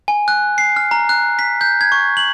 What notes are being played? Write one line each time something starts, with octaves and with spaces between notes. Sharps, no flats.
G#5
F#6
C7
F6
A#5
F#6
B6
G6
G#6
C#6
F#7